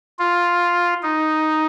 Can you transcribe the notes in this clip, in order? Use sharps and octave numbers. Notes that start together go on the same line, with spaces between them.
F4
D#4